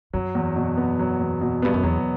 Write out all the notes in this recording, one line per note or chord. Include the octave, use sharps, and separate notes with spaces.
F#2 F#3
E2
B2
B3
F#3
E2
B2
G2 B3
F#2
E2 F#3